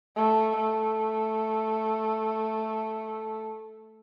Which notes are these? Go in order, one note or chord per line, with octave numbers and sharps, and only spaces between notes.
A3
A3